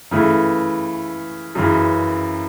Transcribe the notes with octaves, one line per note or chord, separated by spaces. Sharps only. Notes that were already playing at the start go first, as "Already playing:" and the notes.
C#3 E3 A3
F#2 C#3 E3